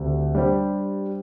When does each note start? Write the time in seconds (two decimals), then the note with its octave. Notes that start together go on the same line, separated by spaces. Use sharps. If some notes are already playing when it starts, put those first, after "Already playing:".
Already playing: D2 D3 A3 C4 G4
0.35 G3 D4 G4 C5